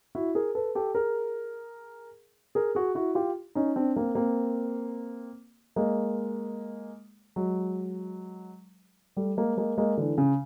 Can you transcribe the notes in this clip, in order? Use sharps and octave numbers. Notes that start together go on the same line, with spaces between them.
E4 F#4
G#4 A#4
A4 B4
G4 A4
G#4 A#4
G#4 A#4
F#4 G#4
E4 F#4
F4 G4
C#4 D#4
C4 D4
A#3 C4
A#3 C4
G#3 A#3
F#3 G#3
G3 A3
G#3 A#3
G#3 A#3
G#3 A#3
D3 E3
C#3